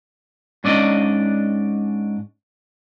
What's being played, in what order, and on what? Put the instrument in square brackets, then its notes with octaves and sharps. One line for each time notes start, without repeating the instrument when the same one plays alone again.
[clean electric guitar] G#2 C#4 D4 D5 D#5